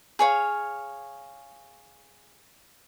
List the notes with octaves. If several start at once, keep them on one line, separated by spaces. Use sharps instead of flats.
G#4 C#5 F5